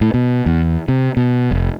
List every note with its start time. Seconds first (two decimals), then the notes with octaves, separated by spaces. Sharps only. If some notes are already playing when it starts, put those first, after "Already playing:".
0.01 A2
0.14 B2
0.46 E2
0.88 C3
1.17 B2
1.51 F1